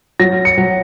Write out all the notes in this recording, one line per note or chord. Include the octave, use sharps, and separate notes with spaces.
F#3 A#6
C#7
F#3